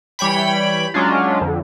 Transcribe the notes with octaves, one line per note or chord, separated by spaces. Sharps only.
E3 G3 C#5 G5 B5
F#3 G#3 C#4 D4 F4
F2 D3